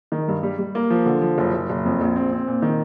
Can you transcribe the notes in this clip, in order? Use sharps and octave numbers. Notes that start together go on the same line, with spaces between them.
D#3
G2
G3
G3
A#3
F3
D3
F3
F#1
F#1
F#1
F2
A#1
C4
C4
A#2
D#3